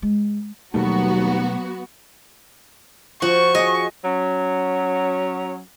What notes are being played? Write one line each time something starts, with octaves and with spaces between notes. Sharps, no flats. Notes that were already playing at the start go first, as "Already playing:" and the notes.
G#3
D#2 B2 F#3 G3 A3 B3 F#4
F3 F#4 C#6
G#4 D#5 G#5
F#3 C#4